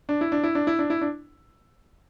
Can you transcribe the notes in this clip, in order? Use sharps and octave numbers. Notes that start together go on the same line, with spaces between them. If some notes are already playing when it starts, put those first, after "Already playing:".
D4
E4
D4
E4
D4
E4
D4
E4
D4